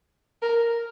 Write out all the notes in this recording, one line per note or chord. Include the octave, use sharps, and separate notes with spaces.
A#4